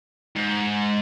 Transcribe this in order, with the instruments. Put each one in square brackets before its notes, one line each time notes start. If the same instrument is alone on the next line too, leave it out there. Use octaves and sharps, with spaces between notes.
[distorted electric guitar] G#2